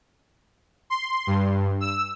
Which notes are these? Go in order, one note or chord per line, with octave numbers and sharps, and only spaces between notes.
C6
G2
E6